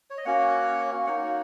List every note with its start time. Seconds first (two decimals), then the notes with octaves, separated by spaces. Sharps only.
0.10 C#5
0.18 D#5
0.25 A#3 C#4 F#4 C#5 F#5
1.06 A#3 D#4 F#4 C#5 F#5